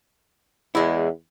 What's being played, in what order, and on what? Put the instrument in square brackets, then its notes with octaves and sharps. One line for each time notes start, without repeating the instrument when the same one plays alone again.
[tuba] E2 [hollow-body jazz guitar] G#3 E4